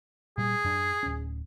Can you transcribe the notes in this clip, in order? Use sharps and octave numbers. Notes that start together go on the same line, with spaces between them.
A#2 G3 G#4
F#2 D4
D1 C#4